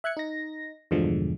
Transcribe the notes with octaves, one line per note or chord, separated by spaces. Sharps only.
E5 F#6 G#6 C#7
D#4 A#6
E2 G2 B2 D3 F3 G#3